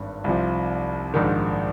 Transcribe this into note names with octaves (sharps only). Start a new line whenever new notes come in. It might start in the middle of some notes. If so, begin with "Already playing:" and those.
Already playing: G#1 G2
C2 C3 F3
A#1 G#2 D#3